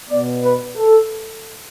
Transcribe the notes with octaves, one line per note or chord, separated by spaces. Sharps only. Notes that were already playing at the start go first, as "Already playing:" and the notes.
B2 B3 D5
B4
A4